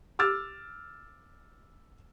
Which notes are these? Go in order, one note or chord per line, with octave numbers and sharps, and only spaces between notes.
D6 E6 F6 A6